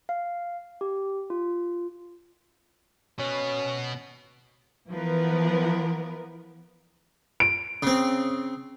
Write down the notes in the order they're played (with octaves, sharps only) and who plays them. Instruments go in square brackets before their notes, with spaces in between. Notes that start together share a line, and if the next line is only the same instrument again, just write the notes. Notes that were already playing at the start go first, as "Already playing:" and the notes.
[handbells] F5
G4
F4
[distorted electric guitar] B2 B3 [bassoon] C#4
[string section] E3 F3 B3 A#4 B4
[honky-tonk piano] D7
[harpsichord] C#3 C4